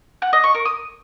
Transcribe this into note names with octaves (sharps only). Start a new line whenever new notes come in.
F#5
D#5
C#6
A#4
D#6